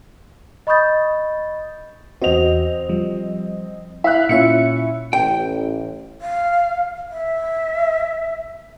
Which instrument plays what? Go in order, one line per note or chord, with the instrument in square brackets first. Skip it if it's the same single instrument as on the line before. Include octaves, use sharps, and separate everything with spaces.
[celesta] D#5 B5 C#6 D#6 G6 A6
[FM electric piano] E2 F#4 [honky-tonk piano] C4 D#5 F7
[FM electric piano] F3 G3
[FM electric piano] E4 [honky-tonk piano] E5 F5 F#6
[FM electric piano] A#2 F4 E5 [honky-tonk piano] C#4 E4 C#7
[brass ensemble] A1 [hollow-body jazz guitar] G5
[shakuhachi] F5
E5